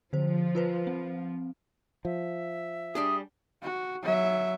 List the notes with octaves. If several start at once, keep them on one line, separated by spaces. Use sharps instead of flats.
D3 F3 C5
F4 B4 C5
C4
F3 E5
G3 D4 G#4 D#6
F#4
F#3 E5